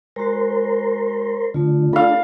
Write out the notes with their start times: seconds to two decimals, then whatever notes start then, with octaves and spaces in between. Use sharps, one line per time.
0.16 G#3 F#4 A#4 C5
1.54 D3 A3 F4
1.93 D4 A4 F5 B5